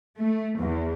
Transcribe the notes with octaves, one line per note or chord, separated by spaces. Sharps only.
A3
E2